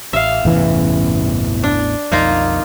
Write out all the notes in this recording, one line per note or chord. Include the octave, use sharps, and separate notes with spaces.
A1 E5 F5
A1 E2 G2 C3 E3 C#4
D4
B1 F2 A#3 D#4 F4